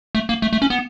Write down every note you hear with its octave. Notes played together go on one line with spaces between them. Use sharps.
A3
A#3
A3
A3
C#4
B3